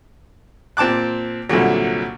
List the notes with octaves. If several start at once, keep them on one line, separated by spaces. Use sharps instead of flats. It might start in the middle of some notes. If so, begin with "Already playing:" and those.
A#2 C4 A5 D6 F#6
C2 A#2 D3 F#3